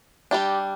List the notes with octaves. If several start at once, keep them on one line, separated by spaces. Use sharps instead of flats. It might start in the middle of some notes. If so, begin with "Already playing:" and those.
G3 D4 G4